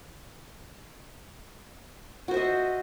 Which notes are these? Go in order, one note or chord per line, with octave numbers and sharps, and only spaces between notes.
F#4 C5 D#5 E5